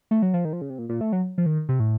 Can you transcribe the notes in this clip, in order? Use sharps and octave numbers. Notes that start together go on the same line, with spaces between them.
A3
F#3
F3
D#3
F3
C#3
C3
A#2
A#2
A3
F#3
F3
D#3
C3
A2